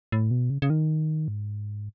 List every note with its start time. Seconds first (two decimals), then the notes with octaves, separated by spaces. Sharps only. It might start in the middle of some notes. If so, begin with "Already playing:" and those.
0.12 A2
0.31 B2
0.50 C#3
0.62 C#3
0.70 D#3
1.28 G#2